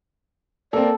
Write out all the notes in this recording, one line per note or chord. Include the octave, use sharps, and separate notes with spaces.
A#3 C4 A4 D5